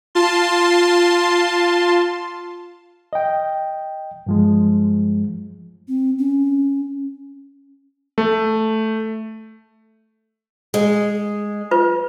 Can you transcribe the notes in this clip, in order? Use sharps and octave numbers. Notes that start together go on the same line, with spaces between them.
F4 A5 C6
D#5 G5
G2 F3 G#3
C4
C#4
A3
G#3
F4 B4